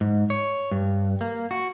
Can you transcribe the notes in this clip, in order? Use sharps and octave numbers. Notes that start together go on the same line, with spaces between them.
G#2
C#5
G2
A#3
F#4